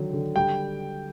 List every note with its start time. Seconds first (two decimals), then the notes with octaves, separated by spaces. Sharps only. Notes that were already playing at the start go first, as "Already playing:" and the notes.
Already playing: D3 D#3 F#3
0.13 D3
0.36 G3 G5